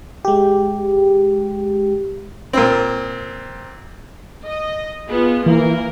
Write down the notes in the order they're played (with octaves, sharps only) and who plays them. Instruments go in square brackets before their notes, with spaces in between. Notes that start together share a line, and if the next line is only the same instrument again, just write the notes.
[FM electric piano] G#3 G4
[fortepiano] A#2 C4
[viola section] D#5
B3 F4 G#4
[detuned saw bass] E3 [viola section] A#3 A#4